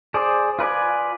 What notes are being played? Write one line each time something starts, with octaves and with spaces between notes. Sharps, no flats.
G#4 C5 D5
F4 B4 D5 G#5